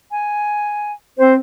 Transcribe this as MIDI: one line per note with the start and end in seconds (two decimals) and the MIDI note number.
0.11 0.92 80
1.18 1.36 60
1.18 1.33 72